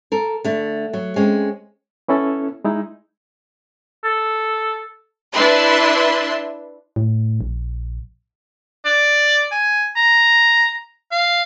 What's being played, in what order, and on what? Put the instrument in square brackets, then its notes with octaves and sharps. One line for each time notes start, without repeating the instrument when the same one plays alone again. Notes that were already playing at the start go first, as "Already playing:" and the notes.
[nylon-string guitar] A4 A#4
D3 A3
F#3
G#3 C4 C#4
[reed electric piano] B3 C#4 E4 A4
G#3 D#4 E4
[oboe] A4
[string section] D4 E4 B4 E5 C6
[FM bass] A2
A#1
[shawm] D5
G#5
A#5
F5